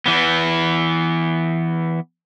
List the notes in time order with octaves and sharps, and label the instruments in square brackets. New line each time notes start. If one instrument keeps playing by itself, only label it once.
[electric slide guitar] E3 B3